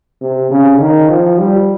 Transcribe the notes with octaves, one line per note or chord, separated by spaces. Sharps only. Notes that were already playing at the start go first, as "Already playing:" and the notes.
C3
C#3
D#3
F3
G3